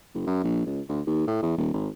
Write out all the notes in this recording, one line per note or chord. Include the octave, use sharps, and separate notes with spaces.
F#1
F#2
A#1
C#2
D2
D#2
A2
E2
D#1
G#1